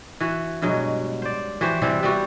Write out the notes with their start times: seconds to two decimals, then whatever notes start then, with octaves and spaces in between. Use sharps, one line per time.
0.20 E3 F#4
0.62 G2 B2 F#3 G#3
1.22 C5 D5
1.61 E3 F#4 G4 C5
1.82 C3 E3 G3 C4
2.03 G3 B3 F#4 G4